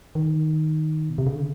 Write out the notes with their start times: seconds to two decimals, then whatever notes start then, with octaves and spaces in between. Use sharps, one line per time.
0.15 D#3
1.10 B2
1.18 C3
1.27 C#3
1.35 D3